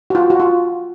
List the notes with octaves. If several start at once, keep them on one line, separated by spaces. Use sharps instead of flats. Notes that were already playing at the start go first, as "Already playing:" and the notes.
F#4
F4
F#4
F4